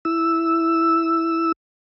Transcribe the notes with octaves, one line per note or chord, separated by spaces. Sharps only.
E4 E6